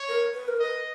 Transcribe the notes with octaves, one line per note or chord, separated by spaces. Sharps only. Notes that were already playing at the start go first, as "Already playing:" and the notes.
Already playing: C#5
A#4
B4
A#4
B4 D#5